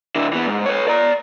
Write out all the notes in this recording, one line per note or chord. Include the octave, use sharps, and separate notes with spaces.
D3 E4
E3 B3
G#2
B4 C#5
D5 A#5